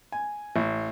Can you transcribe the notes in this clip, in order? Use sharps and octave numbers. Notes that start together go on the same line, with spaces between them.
G#5
A1